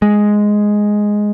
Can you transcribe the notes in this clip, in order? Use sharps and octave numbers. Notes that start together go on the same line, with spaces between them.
G#3